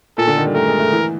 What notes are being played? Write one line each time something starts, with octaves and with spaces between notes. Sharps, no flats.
A#2 A4
D3
D#3
G3
A3 A#4
G#3
A3
E3